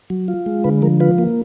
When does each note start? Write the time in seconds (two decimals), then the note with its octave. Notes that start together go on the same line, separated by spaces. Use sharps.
0.10 F#3
0.28 F4
0.46 G#3
0.64 D3 B4
0.82 F3 A#4
1.00 F4 B4
1.18 A#3